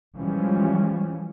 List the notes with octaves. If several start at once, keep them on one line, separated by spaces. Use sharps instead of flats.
E3 F3 G3 G#3 C#4